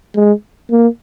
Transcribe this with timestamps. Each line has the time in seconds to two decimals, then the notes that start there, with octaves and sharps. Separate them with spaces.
0.16 G#3
0.71 A#3